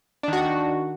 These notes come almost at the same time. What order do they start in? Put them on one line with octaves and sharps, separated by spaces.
D4 D#3 F#4